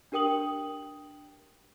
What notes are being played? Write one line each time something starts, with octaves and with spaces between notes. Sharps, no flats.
D4 G4 A#4 G5 D#6 F#7